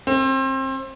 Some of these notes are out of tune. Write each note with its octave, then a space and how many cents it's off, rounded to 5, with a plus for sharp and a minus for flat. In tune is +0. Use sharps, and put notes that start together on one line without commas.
C4 +30